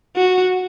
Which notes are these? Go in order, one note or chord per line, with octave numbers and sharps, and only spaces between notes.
F#4